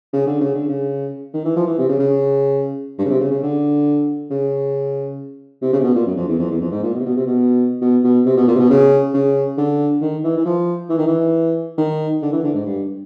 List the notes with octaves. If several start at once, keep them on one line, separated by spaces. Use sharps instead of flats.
C#3
D3
C#3
D3
C#3
D#3
E3
F3
E3
C3
C#3
C#3
G2
C#3
C3
C#3
C#3
D3
C#3
C3
C#3
C3
B2
A#2
F#2
F2
E2
F2
E2
F2
G#2
A#2
B2
C3
B2
C3
B2
B2
B2
C3
B2
A#2
C3
B2
C#3
C#3
D3
D#3
E3
E3
F3
E3
D#3
E3
D#3
D3
E3
D3
G#2
G2